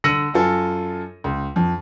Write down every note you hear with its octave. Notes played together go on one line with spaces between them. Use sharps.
D3 E6 A#6 C#7 D#7 F#7
F#2 F4 A4 G#5
C#2
F2